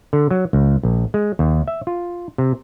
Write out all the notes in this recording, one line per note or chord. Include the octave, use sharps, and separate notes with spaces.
D3
F#3
C#2
A#1
G#3
D#2
E5
F4
C3